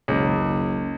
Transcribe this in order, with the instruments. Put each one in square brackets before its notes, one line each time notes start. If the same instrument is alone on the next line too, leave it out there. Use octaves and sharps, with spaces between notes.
[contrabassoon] F#1 [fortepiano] C#2